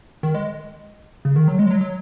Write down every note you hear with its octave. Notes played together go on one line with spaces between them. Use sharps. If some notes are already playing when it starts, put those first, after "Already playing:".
D#3
G#3
C#3
D#3
F#3
G#3
F#3
F#3